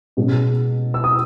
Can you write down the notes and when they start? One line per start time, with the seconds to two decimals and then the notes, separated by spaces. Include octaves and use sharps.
0.17 B2 G#3 C#4
0.94 E6
1.04 D#6